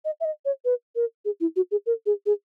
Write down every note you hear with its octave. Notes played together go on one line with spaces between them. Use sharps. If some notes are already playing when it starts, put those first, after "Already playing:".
D#5
E5
D#5
C#5
B4
A#4
G#4
E4
F#4
G#4
A#4
G#4
G#4